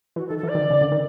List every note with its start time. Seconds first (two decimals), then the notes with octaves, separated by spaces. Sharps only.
0.16 E3 F#4
0.27 A4
0.30 D#3
0.38 A4
0.43 E3
0.48 D5
0.55 D#3
0.59 D3
0.70 C#3
0.81 D3
0.92 D#3